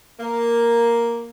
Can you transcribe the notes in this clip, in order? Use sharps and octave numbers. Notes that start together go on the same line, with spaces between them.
A#3